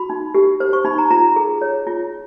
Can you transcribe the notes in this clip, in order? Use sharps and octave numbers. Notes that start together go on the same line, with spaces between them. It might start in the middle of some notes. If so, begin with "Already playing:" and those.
Already playing: F#4 B5
D#4
G4
C5
C#6
D#4 B5
A#5
F4 A#5
G#4
C#5
F4